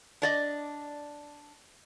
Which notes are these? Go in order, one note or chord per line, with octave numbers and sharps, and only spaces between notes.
D4 D5 D#5